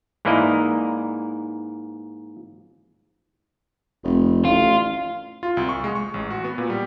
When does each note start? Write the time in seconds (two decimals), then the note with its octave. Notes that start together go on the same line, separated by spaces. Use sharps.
0.25 G#2 E3 A#3 E4 D5 D#5
4.04 F1
4.45 A1 F4
5.43 F4
5.57 C2
5.69 C#6
5.84 G#3
5.95 C#6
6.14 A1
6.30 F#4
6.44 B3
6.58 A#2
6.70 G3